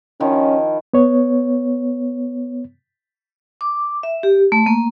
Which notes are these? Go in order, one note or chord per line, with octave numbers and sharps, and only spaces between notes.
D#3 F3 C#4 E4
B3 C#5
D6
E5
G4
A3
A#3